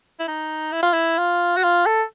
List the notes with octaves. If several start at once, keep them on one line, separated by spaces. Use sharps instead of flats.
E4
D#4
E4
F4
E4
F4
F#4
F4
A4